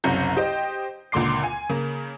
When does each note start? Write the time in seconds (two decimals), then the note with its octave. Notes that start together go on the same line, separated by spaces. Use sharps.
0.04 F#1 C2 F#2 C#4 A#5 G6
0.37 G4 C5 D#5 G5
1.12 C#2 A#2 D3 C6 D6 C7
1.44 G#5
1.69 C#3 A#3